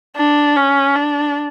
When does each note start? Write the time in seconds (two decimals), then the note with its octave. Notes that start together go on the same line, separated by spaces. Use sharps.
0.17 D4
0.57 C#4
0.95 D4